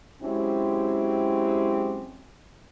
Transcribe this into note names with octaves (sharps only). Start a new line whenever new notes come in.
F#3 G#3 C4 C#4 E4 G4